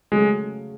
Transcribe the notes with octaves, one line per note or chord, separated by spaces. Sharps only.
C#3 F#3 G#3 A3 C#4 G#4